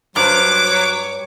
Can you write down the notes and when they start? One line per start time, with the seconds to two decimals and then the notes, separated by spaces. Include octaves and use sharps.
0.16 G2 F#3 C5 D6
0.65 C#5